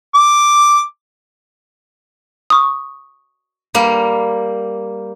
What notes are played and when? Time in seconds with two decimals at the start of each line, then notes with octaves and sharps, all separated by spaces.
0.15 D6
2.50 C#6 D#6
3.75 G3 A#3